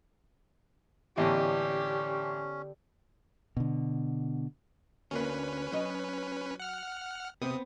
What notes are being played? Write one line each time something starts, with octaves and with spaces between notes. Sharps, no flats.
A1 D3 B3 C#4 G4 D#5
B2 D3
D2 A#3 C#4 D4 B4
F#3 D#5
F#5 F6
C3 B3 C4 D#6